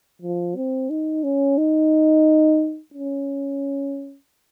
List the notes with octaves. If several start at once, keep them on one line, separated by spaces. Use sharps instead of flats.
F3
C4
D#4
C#4
D#4
C#4